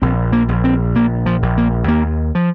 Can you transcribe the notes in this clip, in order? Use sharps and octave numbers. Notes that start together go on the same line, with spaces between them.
A#1 C4
A#3
A#1
C4
A#1 A#3
F3
A#1
A#3
D#2 A#3
F3